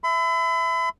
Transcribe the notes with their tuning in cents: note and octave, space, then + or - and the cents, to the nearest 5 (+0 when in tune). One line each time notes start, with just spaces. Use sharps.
E5 +0 B5 +40